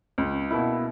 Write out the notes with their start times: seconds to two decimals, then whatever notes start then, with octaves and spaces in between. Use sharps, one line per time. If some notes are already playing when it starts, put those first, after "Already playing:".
0.18 C#2
0.51 B2 A#3 E4